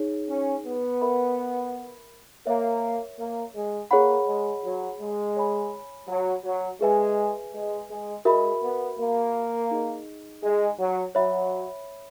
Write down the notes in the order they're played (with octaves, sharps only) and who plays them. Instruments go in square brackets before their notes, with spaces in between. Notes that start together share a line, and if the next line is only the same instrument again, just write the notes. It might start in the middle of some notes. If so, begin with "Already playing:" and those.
Already playing: [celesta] D#4 G#4 C#5
[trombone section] C#4
B3
[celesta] A#4 E5 B5
[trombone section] A#3 [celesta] A#4 C#5 E5
[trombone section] A#3
G#3
[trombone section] A#3 [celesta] G#4 C#5 F#5 B5
[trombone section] G#3
F#3
G#3
[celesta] C#5 G#5 B5
[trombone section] F#3
F#3
[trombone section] G#3 [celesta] G#4 B4 E5 G#5
[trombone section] G#3
G#3
[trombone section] G#3 [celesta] F#4 A#4 E5 B5
[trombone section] B3
A#3
[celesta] D#4 G#4 D#5
[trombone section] G#3
F#3
[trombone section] F#3 [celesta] C#5 E5 B5